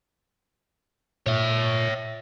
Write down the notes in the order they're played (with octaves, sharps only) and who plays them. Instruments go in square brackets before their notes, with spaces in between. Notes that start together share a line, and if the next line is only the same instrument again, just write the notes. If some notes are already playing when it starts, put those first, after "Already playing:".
[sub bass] A#2 [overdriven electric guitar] C#5 E5